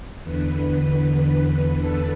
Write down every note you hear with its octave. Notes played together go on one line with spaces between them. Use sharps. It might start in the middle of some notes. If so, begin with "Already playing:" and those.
E2 D3 B4
B4
A4